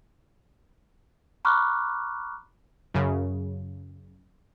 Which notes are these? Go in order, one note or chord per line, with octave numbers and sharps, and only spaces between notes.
A#5 B5 C#6 D6 F6 F#6
F#2 C#3